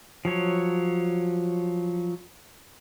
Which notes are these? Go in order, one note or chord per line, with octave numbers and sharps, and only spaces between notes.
F3 F#3 C#5